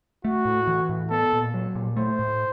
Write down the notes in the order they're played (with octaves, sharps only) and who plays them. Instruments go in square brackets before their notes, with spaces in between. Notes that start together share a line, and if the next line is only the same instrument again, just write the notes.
[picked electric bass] A3 [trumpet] F#4
[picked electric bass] A2
E3
A2
[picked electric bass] B3 [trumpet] A4
[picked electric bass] A#2
F#3
A#2
[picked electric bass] A3 [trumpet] C5
[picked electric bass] A2